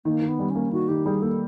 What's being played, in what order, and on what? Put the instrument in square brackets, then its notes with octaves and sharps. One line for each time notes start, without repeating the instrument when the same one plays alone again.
[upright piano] D#3 [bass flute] A#3
[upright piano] D#3
[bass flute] B3
[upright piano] G3
[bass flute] C#4
[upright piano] A#3
[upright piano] D#3 [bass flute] F#4
[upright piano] D#3 [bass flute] G4
[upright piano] G3 [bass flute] G#4
[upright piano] A#3 [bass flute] A4